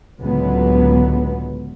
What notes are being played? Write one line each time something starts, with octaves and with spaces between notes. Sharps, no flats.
C#2 A2 D3 F#3 G#3 B3